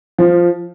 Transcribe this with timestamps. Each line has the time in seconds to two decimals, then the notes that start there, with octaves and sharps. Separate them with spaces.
0.18 F3